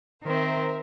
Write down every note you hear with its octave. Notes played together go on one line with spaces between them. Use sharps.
D#3 C4 A#4 C5 E5